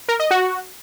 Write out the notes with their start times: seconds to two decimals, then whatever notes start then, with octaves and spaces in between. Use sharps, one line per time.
0.08 A#4
0.20 D#5
0.31 F#4